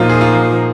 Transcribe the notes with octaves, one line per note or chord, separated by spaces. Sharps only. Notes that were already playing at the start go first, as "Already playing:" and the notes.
Already playing: A#2 F3 A#3 D#4 F4
G#4
F4